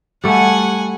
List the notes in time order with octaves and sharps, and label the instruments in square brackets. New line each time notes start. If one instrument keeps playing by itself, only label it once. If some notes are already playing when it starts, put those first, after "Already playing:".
[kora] G3 A3 [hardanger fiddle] F#5 G#5